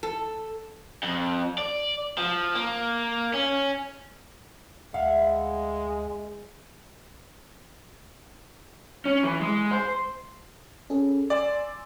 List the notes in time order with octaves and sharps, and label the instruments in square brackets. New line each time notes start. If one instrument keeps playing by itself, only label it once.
[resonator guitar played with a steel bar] A4
[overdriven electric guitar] F2
D5
F3
A#3
C#4
[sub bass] D2 [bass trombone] G#3 [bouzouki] E4 [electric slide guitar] F5 F#5
[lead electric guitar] C#4
E3
G#3
C5
[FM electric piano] C#4 G#4 A4
[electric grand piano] D5 [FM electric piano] G#5 C6 E6